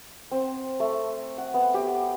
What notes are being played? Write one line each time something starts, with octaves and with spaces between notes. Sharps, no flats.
C4
A3
F#5
B3
G4